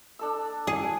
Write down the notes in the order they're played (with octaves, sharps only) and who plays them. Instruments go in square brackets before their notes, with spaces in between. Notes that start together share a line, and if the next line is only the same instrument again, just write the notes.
[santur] D4 A4 E6
[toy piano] E4 D5 E5 [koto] G#4
[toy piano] G#5 A5